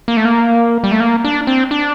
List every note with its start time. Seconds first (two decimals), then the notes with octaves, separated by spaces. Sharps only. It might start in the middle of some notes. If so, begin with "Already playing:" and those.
0.08 A#3
0.17 A3
0.25 A#3
0.84 G3
0.92 A3
1.00 A#3
1.25 D4
1.47 C4
1.71 D4